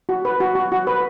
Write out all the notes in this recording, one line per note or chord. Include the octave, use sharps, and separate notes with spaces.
F#4
B4
F#4
F#4
F#4
B4